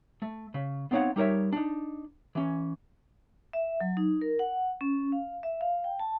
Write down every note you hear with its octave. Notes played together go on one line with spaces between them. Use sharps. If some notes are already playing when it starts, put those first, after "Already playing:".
A3
C#3
B3 C4 D#4 C#5 F5 F#5
G3 D#4 A#4 C#5 E5
D4 D#4
E3 C#4
E5
F#3
D#4
A#4
F#5
C#4
F5
E5
F5
G5
A5